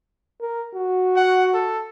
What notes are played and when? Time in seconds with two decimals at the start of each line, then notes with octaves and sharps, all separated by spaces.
0.41 A#4
0.75 F#4
1.16 F#5
1.54 A4